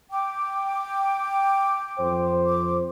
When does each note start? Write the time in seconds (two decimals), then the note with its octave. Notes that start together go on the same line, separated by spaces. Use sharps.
0.11 G5 D6
1.99 F2 C5
2.46 D6